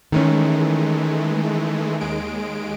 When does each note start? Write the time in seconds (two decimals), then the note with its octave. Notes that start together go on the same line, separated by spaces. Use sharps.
0.12 D#3 E3 G#3 A3 C#4
2.00 D#2 G#3 D7